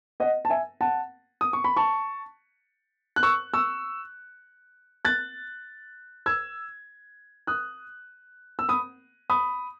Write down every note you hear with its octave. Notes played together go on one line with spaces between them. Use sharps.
D#5 F#5
A5
E5 G#5
F#5 A5
D#6
C#6
B5
A5 C#6
F#6
C#6 E6
C#6 E6
F#6 A6
E6 G#6
D#6 F#6
E6
B5 D#6
B5 D#6